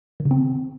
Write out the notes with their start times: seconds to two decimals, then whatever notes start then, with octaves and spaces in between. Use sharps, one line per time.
0.20 D#3
0.25 C#3
0.31 C4